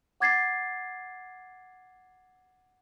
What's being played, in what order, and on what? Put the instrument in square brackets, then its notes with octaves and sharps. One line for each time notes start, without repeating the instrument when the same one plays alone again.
[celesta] F#5 D6 G#6 A6 C7